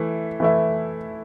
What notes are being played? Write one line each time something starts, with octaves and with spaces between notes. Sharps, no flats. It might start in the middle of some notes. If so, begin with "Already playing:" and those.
Already playing: E3 A3 E4
E3 A3 E4